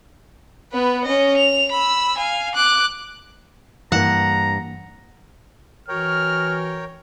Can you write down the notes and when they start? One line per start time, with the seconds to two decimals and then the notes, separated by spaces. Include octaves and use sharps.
0.72 B3 B4
1.04 C#4 D#5
1.37 F7
1.71 B5 E6
2.17 F5 G#5
2.55 D6 F#6
3.92 G2 E3 A#3 F#5 A#5
5.88 E3 F#4 A#4 C#5 G5 F6